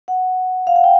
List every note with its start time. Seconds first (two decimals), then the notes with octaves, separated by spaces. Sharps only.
0.08 F#5
0.67 F5
0.76 F#5
0.84 G5